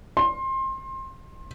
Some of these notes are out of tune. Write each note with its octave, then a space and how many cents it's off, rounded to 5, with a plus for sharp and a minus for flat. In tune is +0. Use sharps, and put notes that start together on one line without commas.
C6 +25